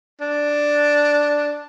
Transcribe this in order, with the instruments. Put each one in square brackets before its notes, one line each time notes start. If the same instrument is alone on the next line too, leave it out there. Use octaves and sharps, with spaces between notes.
[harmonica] D4